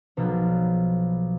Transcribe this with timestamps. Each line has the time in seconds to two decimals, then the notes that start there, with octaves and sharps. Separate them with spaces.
0.17 B1 B2 F3